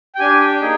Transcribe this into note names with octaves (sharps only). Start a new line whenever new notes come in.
G5
D4 G4 G#5
G5
A#3 D#4 G#4